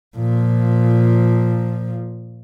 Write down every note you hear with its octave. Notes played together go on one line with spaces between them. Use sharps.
A#2 F3